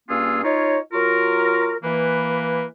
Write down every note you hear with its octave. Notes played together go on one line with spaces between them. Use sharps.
G2 A#3 C#4 F4 G#4 E6
D#4 F4 C#5
F#3 F4 F#4 A#4
E3 A#3 B4